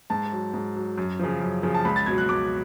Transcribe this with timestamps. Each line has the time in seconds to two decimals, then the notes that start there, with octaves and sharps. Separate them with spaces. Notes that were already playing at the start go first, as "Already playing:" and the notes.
0.10 G#2 A5
0.32 F#3
0.54 G#2
0.76 F#3
0.98 F#2
1.19 C#3 F3
1.41 F#2
1.63 C#3 F3
1.74 A5
1.85 C#2 B5
1.96 A6
2.06 B2 F#3 G#6
2.18 F#6
2.29 C#2 D6